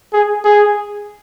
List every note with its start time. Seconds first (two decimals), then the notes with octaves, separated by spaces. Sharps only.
0.13 G#4
0.45 G#4